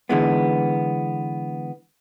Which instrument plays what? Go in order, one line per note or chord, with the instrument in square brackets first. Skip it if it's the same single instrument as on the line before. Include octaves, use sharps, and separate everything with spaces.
[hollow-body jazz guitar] D3 E3 G#3 B3